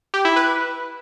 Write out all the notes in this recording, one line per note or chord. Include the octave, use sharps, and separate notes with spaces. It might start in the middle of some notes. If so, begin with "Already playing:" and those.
G4
E4
B4